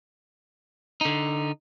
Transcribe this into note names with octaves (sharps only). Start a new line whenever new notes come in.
D3 D#4